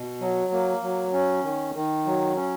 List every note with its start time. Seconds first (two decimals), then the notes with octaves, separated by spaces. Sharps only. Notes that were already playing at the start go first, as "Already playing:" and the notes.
Already playing: B2
0.21 F#3
0.52 A#3
0.83 F#3
1.13 C#4
1.44 D#3
1.75 D#3
2.06 F#3
2.36 C#4